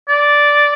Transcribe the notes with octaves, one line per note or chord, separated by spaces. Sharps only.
D5